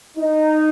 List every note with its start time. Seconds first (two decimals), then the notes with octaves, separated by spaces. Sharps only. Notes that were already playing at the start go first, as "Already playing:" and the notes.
0.18 D#4